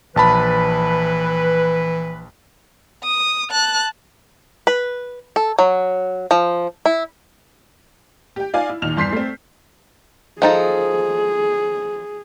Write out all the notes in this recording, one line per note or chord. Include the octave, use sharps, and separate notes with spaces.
A#1 E3 B4 A5 B5
D#6
A5 F#6
B4
A4
F#3
F3
E4
G4 G5
D#4 F4 D5 F5 G#5
E4
D#2 A#2 D#4 F6 F7
E2 G2 C6 G6 B6 C7
A3 C4
F3 D#4 G#4 A4